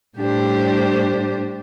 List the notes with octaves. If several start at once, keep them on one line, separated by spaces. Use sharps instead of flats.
A2 G3 D4 G4 C5